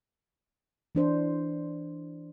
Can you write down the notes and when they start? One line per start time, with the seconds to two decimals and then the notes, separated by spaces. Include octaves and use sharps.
0.95 E3 D4 C5